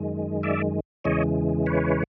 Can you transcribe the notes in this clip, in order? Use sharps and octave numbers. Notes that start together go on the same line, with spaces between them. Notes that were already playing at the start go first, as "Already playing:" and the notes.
Already playing: F#2 D#3 G#3
D5 E5
E2 C#3 E3 G#3 C#5 D#5
B4 C#5